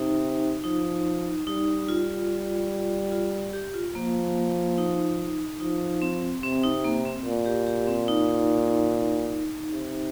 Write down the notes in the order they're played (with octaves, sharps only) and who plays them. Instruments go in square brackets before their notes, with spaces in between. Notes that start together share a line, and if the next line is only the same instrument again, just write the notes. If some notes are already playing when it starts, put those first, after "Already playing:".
Already playing: [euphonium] C3 [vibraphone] D#4
[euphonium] F3 [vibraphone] D#4
[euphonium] G3 [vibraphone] D#4
[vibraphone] F4
F4
G4
F4
[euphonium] F3 [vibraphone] A#3
[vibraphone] D#4
[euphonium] F3 [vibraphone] D#4
[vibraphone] C4
[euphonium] C3 [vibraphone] C4
[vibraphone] D#4
A#3
C4
[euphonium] A#2
[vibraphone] G4
G4
C4
D#4
[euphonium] C3